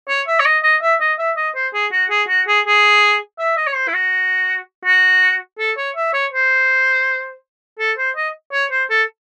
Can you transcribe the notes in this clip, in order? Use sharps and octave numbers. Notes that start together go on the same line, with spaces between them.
C#5
E5
C#5
D#5
D#5
E5
D#5
E5
D#5
C5
G#4
F#4
G#4
F#4
G#4
G#4
E5
D#5
C#5
C5
E4
F#4
F#4
A4
C#5
E5
C#5
C5
A4
C5
D#5
C#5
C5
A4